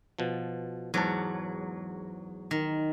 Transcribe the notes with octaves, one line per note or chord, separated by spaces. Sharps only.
B2 F3
E2 G#2 F#3 A5
D#3